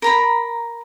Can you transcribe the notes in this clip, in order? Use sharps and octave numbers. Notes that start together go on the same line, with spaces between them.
A#4 A#5 B5